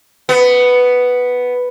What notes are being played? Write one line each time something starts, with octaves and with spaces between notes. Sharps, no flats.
B3